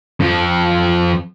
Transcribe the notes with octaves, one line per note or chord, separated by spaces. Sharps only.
F2 F3